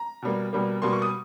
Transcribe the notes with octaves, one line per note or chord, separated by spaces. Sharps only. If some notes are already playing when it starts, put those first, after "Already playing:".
Already playing: A#5
B2 G3 A#3
B2 G3 A#3
B2 G3 A#3 C6
C#6
D#6